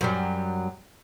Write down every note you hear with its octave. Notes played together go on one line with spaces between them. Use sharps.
F#2 F#3 G3